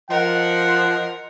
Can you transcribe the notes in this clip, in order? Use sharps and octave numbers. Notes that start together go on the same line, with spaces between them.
F3 A#4 D#5 F#5